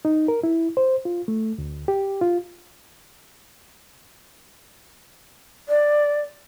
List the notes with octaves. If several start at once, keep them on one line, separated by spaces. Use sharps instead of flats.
D#4
A#4
E4
C5
F4
A3
D2
G4
F4
D5